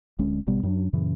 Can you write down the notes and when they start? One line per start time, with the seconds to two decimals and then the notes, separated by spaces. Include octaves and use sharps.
0.19 D1 D2 G#3 C#4
0.47 G#1 B2 G3 B3
0.63 F#2 F#3 D4
0.93 F#2 A#2 C#3 E3